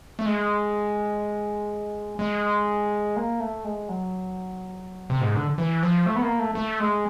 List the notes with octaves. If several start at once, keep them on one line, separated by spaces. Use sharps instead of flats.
A3
G#3
G#3
A#3
A3
G#3
F#3
C3
G#2
D3
E3
F3
A3
B3
A#3
A3
A3
G#3